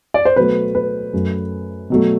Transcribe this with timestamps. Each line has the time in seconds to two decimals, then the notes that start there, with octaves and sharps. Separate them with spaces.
0.14 D5
0.25 C5
0.36 B2 F#3 A3 B4
0.75 B4
1.13 F#2 F#3 A3
1.90 B2 F#3 A3